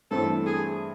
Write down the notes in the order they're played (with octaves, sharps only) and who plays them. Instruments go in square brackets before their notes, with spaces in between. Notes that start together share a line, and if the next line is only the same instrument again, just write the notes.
[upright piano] G2 E3 A3 C4 E4 [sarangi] A4
[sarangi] G#4